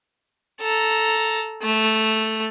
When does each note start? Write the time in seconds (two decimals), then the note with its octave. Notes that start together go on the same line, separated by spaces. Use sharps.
0.61 A4 A#5
1.62 A3